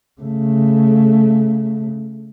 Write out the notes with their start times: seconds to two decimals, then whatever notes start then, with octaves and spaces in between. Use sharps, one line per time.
0.21 C#3 A3